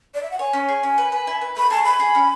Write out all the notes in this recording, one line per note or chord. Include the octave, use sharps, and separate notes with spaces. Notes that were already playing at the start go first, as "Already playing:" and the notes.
D5
E5
F#5
C#5 G#5
C#4
G#4
C#4
B4
B4
E4
B4
A3 B5
G#4 A5
A3 B5
G#4
C#4